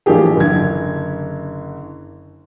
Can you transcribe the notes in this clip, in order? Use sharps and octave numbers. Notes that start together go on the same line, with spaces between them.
A1 F3 A#3 D4 G4 G#4
F#1 D3 G#6